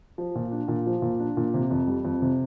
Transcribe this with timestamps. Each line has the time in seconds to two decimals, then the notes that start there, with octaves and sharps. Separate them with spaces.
0.18 F3
0.35 A#2
0.51 D4
0.68 A#2
0.86 F3
1.02 A#2
1.19 D4
1.37 A#2
1.54 C3
1.71 F2
1.87 G3
2.05 F2
2.22 C3